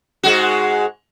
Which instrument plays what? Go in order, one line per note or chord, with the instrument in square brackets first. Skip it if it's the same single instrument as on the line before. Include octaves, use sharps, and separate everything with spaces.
[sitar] G#2 G#3 F#4